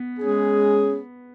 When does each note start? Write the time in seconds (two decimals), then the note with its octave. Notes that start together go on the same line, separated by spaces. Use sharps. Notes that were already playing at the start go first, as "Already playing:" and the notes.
Already playing: B3
0.20 G#3 C#4 G#4